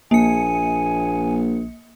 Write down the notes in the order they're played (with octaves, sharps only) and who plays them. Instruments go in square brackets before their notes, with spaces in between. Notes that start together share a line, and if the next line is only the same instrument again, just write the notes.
[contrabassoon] A#1 [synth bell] A#3 C#7 [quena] G#5